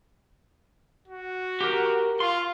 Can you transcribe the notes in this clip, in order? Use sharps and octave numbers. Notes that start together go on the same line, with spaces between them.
F#4
G4 A#4
F4 C6